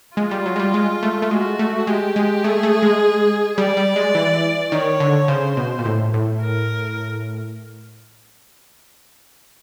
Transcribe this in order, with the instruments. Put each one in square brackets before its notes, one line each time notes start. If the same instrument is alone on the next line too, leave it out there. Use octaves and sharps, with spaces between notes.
[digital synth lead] G#3 [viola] F4
[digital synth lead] G3
F#3
G#3
G3
G#3
A3
A3
[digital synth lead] G#3 [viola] F#4
[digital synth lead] A3
[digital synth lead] G#3 [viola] G4
[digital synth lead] G#3
[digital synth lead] A3 [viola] G#4
[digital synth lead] A3
G#3
[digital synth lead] G3 [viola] D5
[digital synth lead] G3
G#3
E3
[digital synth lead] D#3 [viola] C#5
[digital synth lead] D3
[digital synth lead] C#3 [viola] C5
[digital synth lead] B2
A#2
A2
A2
[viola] A#4